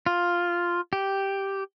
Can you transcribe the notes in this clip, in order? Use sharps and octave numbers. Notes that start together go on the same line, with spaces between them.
F4
G4